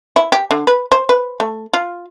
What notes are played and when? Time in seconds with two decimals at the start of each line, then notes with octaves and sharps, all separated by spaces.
0.16 E4
0.32 G4
0.51 D3
0.67 B4
0.92 C5
1.09 B4
1.40 A3
1.73 F4